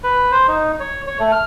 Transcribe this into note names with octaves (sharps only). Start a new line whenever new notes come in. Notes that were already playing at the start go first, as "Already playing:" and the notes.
B4
C5
D#4
C#5
C#5
A3
F6